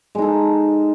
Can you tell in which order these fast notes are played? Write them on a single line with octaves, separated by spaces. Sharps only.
G#3 D#4 A4